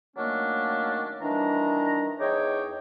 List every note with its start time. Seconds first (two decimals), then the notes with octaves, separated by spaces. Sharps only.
0.17 D#3 F#3 A3 A#3 C#4 D4
1.21 D#3 E3 G3 D4 A#5
2.19 E2 D#4 G#4 C#5 G5 D6